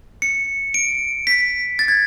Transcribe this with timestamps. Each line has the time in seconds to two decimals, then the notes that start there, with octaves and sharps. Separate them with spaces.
0.22 C#7
0.74 D7
1.27 B6
1.79 A6
1.88 G#6